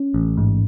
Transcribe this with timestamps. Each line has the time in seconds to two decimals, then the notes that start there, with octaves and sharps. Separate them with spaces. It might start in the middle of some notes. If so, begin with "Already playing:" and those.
Already playing: C#4
0.14 A1
0.37 G#2